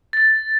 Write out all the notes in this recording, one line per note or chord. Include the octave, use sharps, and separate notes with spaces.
A6